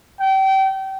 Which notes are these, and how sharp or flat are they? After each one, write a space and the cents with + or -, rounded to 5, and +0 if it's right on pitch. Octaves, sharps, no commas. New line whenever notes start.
G5 -30